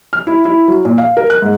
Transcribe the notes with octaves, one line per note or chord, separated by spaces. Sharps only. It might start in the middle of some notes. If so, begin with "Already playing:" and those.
F6
E4
E4
F#3
A#2
F5
A#4
F#6
G#2